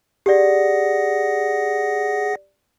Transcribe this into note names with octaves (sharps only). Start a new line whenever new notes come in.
G4 G#4 D5 F#5 A#6